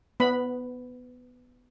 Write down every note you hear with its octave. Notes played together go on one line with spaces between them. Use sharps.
B3 B5